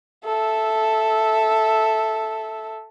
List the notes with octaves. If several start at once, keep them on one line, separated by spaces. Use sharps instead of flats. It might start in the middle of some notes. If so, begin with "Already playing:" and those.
A4 E5